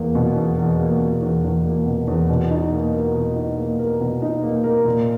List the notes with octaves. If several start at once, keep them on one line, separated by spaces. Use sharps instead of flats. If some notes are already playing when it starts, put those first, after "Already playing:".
Already playing: E2 A#3
B2
E2
E2
A#3
B2
E2
E2
A#3
B2
E2
B2
D#4
A#3
A#4
B2
D#4
A#3
A#4
B2
D#4
A#3
A#4
A#2